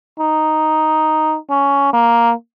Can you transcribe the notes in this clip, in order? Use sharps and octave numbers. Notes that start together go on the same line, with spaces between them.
D#4
C#4
A#3